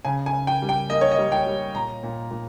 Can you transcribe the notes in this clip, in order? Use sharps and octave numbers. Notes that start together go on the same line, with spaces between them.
C#3 G#5
G#5
C#3
G5
G3
G5
A#3 D#5
C#5
D#5
G3
G5
G3
A#2 A#5
A#2
A#2